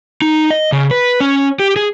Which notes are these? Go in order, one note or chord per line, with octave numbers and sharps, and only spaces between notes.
D#4
D#5
C#3
B4
C#4
G4
G#4